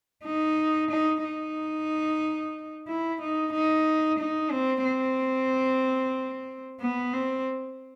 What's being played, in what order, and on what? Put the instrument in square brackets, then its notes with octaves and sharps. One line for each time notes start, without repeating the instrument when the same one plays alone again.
[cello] D#4
D#4
D#4
E4
D#4
D#4
D#4
C4
C4
B3
C4